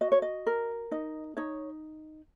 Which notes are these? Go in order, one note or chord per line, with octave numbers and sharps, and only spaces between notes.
F#4 D#5
C#5
D#5
A#4
D#4 D#5
D#4 C#5